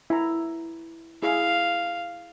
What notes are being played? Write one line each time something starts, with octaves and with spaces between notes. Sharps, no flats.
E4 A#5
E4 G#4 F5